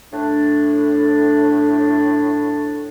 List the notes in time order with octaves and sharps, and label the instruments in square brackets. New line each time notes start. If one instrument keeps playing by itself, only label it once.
[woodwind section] A2 D4